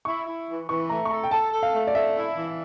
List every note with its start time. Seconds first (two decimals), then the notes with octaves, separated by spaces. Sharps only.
0.05 E4 C#6
0.27 E4
0.48 E3
0.68 E3 C#6
0.89 A3 A#5
1.05 C#6
1.10 A4 A#5
1.23 G5
1.31 A4 A5
1.52 A4
1.63 F5
1.73 A3
1.87 D5
1.94 A3 E5
2.16 E4
2.37 E3